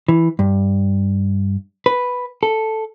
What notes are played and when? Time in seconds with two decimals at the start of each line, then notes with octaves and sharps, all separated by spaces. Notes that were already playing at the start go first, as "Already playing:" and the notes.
0.08 E3
0.39 G2
1.86 B4
2.43 A4